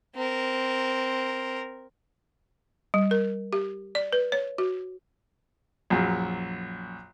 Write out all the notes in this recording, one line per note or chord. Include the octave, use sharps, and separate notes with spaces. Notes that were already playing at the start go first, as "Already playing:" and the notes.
C4 A#4
G3
A#4
G4
D5
B4
C#5
F#4
A#1 F#2